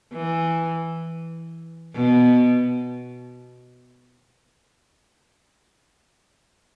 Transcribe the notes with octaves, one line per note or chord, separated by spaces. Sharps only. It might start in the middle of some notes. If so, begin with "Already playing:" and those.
E3
B2